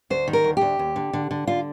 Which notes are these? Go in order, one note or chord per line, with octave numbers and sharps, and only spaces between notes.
D2 C5
D#3
A#4
D2
D2 G4
D#2
D3
D3
D3
D3 F4